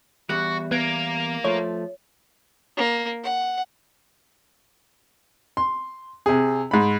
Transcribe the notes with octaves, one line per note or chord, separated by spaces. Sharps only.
E2 G3 F#4 F#6
A#3 B3 A#4 G#6 D7
F3 A3 C#5
A#3
F#5
C6
C3 G#4
G#2 B5